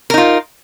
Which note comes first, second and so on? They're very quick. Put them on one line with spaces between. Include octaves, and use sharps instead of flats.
A#4 D#4 F4